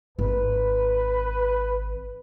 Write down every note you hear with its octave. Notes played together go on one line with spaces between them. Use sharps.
G#1 B4